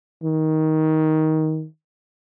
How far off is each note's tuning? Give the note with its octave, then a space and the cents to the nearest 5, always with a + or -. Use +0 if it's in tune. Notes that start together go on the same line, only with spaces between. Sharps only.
D#3 +15